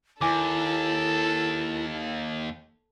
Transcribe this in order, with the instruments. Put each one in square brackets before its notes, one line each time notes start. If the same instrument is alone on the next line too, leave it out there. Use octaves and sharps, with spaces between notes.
[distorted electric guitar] D#2 [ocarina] E4 [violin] A4 [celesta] G#5 D6